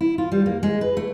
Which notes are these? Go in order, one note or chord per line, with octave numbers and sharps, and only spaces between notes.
E4
F4
G3
A#3
G#3
B4
A3